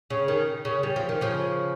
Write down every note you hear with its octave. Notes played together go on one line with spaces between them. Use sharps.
C#3
D#3
C#3
G3
F3
D#3
C#3 F3